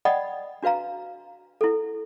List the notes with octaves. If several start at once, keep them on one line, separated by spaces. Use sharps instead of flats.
D5 D#5 F#5 G5 B5 D#6
D4 F#4 B4 F5 A#5
E4 A4